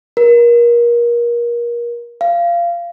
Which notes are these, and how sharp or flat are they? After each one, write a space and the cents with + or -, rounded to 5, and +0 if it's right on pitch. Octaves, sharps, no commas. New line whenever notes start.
A#4 +30
F5 -20